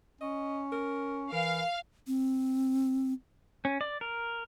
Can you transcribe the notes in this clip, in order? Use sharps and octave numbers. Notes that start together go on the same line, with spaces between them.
C#4 D#5
A#4
E3 A#4 F5
C4
C#4
D5
A#4